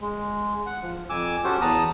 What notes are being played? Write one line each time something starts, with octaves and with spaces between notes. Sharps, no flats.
G#3
F#5
F3
F2 G#5 D6 E6
C#4 F#4 G4 A4 C5
E2 B3 A5 A#5 D#6